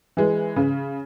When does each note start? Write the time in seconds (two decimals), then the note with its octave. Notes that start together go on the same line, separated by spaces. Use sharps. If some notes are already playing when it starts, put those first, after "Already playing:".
0.17 E3 G#3
0.56 C#3